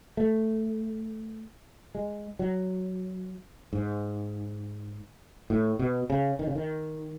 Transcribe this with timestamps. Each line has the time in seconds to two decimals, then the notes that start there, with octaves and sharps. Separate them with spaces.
0.17 A3
1.95 G#3
2.39 F#3
3.73 G#2
5.50 A2
5.79 B2
6.10 C#3
6.39 D#3
6.47 C#3
6.55 D#3